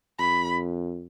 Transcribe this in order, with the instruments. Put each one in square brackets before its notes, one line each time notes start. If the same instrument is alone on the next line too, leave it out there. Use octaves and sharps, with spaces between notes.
[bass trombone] F2 [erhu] B5